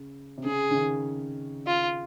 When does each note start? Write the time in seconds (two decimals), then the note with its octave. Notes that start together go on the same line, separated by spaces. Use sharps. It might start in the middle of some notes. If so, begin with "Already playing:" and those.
Already playing: C#3
0.38 C3
0.45 C#3 G#4
0.70 C#3
0.75 D#3
1.67 F4